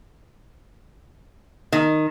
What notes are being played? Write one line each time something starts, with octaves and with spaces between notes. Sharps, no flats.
D#3